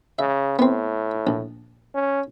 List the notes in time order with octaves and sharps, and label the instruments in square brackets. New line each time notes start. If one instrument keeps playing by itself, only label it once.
[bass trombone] C#3 [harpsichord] E5
[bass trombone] A2 [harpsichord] B3 C4
[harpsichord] A#1
[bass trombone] C#4